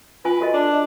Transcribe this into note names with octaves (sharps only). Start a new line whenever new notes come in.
F4 B4 G#5
F#4 A4 D#5
D4